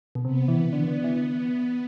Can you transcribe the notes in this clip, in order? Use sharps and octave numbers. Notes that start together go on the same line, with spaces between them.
B2
C3 B3
E3
D3
D3
E3
B3